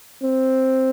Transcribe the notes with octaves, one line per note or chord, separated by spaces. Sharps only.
C4